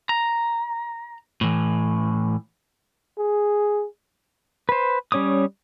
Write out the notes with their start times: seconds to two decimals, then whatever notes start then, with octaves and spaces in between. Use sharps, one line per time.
0.09 A#5
1.41 A2 E3
3.18 G#4
4.69 B4 C5
5.12 G3 C#4 C#5 D6 D#6